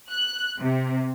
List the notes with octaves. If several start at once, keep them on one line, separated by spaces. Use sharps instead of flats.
F#6
C3